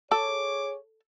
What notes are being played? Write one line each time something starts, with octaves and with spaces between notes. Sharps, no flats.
G#4 A4 C#5 D6